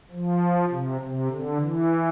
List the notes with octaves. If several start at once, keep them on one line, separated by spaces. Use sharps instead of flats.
F3
C3
C3
D3
E3